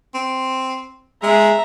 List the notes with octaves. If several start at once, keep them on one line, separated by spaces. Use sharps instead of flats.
C4
G#3 E5 A#5